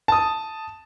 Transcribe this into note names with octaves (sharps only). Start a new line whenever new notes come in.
A5 D#6